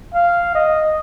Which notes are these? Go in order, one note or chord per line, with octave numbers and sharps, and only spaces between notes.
F5
D#5